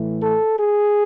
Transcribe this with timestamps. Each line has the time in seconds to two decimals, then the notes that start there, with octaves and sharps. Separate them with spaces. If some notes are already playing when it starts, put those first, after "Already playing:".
Already playing: A2 E3 A3
0.22 A4
0.59 G#4